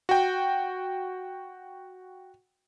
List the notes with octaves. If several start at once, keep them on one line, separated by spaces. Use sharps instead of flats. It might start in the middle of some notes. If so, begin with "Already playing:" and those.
F#4 G5